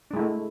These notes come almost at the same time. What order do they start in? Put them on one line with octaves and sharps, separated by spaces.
D4 G#3 E4 A3